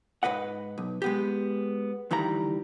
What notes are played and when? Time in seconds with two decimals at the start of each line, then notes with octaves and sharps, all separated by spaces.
0.23 G#2 B4 D#5 F#5
0.78 B1
1.02 G#3 B3 G4
2.11 D2 D#3 E3 G3 A#5